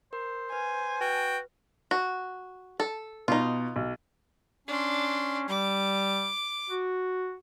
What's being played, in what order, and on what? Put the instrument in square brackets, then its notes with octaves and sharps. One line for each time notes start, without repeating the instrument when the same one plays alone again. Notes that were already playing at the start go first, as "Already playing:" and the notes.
[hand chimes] A#4 [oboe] C5
[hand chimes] B4 [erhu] G#5
[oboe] F#4 [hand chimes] B4 [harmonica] G5
[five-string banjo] F#4
A4
[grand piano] B2 [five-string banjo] D#4 F4
[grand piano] B1
[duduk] C#4 [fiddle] D4 C6
[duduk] G3 [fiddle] D6
[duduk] F#4